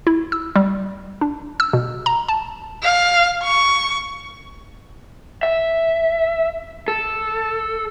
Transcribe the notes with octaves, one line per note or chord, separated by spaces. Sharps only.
E4
E6
G3
D4
E6
B2
A#5
A5
F5
C#6
E5
A4